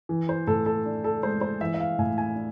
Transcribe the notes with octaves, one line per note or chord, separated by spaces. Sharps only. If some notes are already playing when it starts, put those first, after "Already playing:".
E3
C5
A2 A4
A4
D4
A4
G#3 C5
C5
E3 E5
E5
F5
A2 G#5
G#5
D4